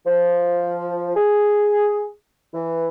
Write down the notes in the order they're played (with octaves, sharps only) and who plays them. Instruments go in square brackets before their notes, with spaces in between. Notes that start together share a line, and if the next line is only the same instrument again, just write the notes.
[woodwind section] F3
G#4
E3